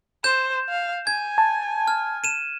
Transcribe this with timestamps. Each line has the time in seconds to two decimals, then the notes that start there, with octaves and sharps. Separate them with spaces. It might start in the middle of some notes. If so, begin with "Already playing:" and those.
0.24 C5 G6 E7
0.69 F5
1.07 G#5 G#6
1.38 A5
1.88 F6
2.24 D#7 E7